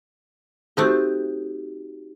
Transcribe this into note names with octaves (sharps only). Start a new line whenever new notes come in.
A3 C4 D#4 F#4 G4 A4